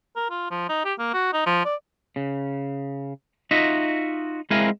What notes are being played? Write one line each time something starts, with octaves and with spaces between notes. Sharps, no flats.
A#4
F4
F3
D#4
G4
A#3
F#4
D#4
F3
D5
C#3
D#4 F4 F#4 D#5 E5
G#3 C4 E4 A#4 F5 G#5